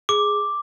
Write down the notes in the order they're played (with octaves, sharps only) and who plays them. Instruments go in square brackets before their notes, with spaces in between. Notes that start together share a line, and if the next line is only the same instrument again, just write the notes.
[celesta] G#4 [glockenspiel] D6